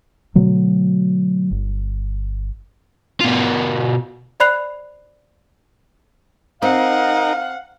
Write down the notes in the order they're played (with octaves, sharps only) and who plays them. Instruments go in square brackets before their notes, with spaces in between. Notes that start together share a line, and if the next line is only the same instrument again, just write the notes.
[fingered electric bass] B2 D3 F#3 A3
G1
[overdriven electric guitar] B2 F4
[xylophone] C5 D5 B5 F#6 C7 F7
[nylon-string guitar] C4 [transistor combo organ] D#4 A#4 [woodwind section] F5 [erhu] F#5